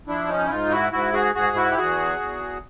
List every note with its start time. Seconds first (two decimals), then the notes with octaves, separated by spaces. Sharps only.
0.07 F3 D4 E4
0.29 C#4 D#4
0.46 E4
0.50 G#2 D#4 F4
0.71 E4 F#4
0.92 G#2 E4 F#4
1.14 F#4 G#4
1.35 G#2 F#4 G#4
1.56 E4 F#4
1.71 G4
1.78 E2 F#4 G#4
2.20 E2